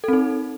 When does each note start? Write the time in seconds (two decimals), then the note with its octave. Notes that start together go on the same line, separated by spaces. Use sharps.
0.04 A4
0.08 C4
0.13 D#4